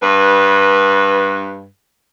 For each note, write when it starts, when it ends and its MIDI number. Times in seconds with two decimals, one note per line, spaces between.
0.02 1.66 43
0.02 1.66 71